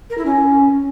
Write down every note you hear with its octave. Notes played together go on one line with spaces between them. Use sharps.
A#4
E4
C#4